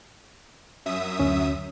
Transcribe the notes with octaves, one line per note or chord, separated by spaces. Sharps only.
F#2 E5 D#6
D2 C#4